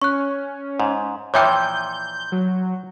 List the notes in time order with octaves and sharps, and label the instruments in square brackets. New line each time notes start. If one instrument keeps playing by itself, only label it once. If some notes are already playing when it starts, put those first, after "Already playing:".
[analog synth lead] C#4 [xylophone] C#6 F#6
[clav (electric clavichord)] G#2
[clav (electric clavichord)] A#2 E3 F3 [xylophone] C#5 E5 G5 [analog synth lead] G6
[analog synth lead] F#3